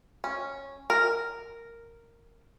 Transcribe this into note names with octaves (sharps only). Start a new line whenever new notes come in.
C#4
A#4